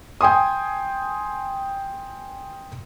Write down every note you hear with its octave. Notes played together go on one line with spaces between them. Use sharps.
G5 G#5 C6 D#6